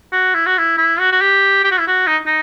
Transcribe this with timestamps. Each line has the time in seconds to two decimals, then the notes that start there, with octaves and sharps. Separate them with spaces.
0.12 F#4
0.35 E4
0.46 F#4
0.58 E4
0.78 E4
0.99 F#4
1.12 F#4
1.21 G4
1.64 G4
1.71 F#4
1.79 E4
1.87 F#4
2.07 D#4
2.26 D#4